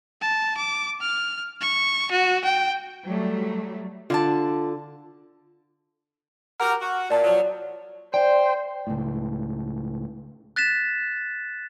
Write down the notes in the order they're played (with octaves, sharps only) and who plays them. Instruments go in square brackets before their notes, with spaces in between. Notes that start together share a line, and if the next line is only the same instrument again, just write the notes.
[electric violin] A5
D6
F6
C#6
F#4
G5
[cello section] F#3 G3 A3
[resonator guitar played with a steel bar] D3 [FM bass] F4 [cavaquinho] D5 F#5 A5
[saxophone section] F#4 G4 A#4 [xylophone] F#5 A#5 F6
[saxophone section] F#4
[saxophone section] A#2 [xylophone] D5 A5
[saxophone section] F3 F#3
[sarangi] C5 [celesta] D5 [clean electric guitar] G5
[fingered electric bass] C#2 A2
[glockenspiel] F#6 A6 B6 E7